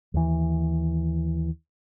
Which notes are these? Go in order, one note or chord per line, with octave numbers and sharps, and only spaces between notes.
D#2 E3